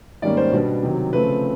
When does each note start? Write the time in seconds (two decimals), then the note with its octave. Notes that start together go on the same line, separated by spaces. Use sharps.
0.22 G#2 D#3 G3 A#3 C#4 D5
0.37 C5
0.53 B2 G3 B3 D4
0.83 C3 D#3 F#3
1.13 C#3 F3 A3 C4 B4